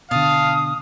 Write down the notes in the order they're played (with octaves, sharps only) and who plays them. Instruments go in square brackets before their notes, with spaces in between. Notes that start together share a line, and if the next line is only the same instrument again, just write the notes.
[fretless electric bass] B2 D3 [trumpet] F5 [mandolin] A5 [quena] D#6